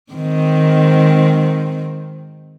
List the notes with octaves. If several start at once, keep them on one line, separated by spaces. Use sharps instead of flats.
G#2 D#3 C4